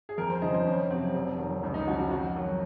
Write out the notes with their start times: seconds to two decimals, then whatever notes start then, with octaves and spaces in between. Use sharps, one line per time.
0.09 G#4
0.18 F2 A#4
0.30 C5
0.42 C#3 F3 D#5
0.54 C5
0.66 F2 C#4
0.90 C3 F#3 C4
1.14 F1
1.38 F2 D#3 F#3
1.63 C#2
1.74 D#4
1.87 C#3 F3 F#4
1.99 F#4
2.11 F2 F#4
2.36 D#3 F#3